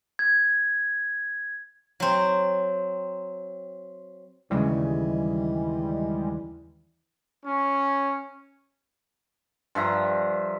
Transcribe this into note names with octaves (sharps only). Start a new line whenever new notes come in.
G#6
F#3 C4
D#2 C#3 E3 G3 G#3
C#4
G2 F3 E5 A#5